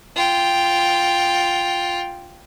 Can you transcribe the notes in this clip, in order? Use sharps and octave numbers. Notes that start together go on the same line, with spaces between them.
F4 G5